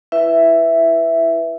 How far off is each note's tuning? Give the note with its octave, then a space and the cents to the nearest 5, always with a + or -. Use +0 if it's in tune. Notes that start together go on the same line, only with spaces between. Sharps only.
E4 +15 B4 +0 E5 +0